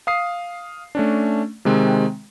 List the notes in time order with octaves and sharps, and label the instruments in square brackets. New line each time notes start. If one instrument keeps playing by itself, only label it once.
[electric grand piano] F5 D#6 C7
A3 C#4 D4
C3 D#3 G#3 C4